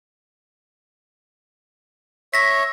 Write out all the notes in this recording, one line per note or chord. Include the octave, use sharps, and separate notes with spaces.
C#5 E5 A#6 B6